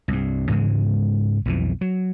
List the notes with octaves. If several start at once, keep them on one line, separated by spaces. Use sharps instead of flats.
C2 G2
G#2 C#3 E3 G#3
B1 F2 E3
F#3